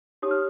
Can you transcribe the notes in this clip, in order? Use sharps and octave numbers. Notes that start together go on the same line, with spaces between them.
D#4 G4 C#5 D#6
F6